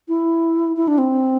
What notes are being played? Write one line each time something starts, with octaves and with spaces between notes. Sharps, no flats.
E4
E4
D4
C4